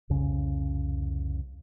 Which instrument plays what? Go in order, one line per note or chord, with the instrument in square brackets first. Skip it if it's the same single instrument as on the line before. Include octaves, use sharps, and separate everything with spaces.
[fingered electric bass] C2 F2 C#3 C#4